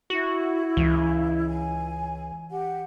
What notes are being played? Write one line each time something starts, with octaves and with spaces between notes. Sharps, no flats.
E4 F#4
C#2 E3
G#5
G4 F#5